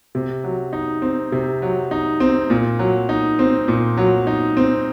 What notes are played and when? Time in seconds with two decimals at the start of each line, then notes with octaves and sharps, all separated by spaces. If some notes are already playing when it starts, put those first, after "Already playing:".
0.15 C3
0.44 F#3
0.73 D#4
1.02 C4
1.32 C3
1.62 F#3
1.91 D#4
2.20 C4
2.50 A#2
2.79 F#3
3.09 D#4
3.39 C4
3.68 A#2
3.97 F#3
4.27 D#4
4.57 C4